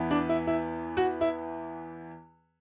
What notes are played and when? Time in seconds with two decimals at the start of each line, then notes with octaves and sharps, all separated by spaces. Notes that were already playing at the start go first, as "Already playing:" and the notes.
Already playing: E2 E3 B3
0.11 D4
0.29 E4
0.47 E4
0.97 F#4
1.21 E4